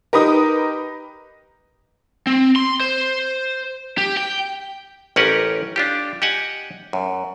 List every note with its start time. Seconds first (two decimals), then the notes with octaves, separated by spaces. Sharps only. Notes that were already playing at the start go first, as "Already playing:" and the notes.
0.13 D#4 G4 A#4 B4 D#6
2.27 C4
2.56 C6
2.80 C5
3.98 G4
4.17 G5
5.16 A1 C#4 G4 A#4 B4 F#5
5.76 D4 F4 G4
6.22 G4 D#5 F#5 G#5
6.93 F#2